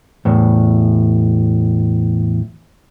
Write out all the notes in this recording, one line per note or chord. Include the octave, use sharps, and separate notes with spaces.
E2 A2